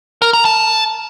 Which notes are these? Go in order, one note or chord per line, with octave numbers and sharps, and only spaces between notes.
A#4
A#5
A5